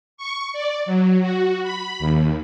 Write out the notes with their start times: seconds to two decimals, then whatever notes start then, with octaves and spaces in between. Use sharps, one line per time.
0.17 C#6
0.53 D5
0.86 F#3
1.20 F#4
1.63 B5
1.99 D#2